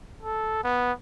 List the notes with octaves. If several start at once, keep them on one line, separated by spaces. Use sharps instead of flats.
A4
B3